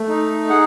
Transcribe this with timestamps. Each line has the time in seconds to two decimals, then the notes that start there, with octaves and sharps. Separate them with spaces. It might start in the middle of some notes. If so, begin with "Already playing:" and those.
Already playing: A3
0.09 D#4
0.49 G#4 F#5